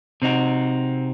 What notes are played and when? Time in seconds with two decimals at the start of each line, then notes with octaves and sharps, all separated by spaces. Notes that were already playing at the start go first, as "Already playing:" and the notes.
0.22 C3 C4 D#4 F#4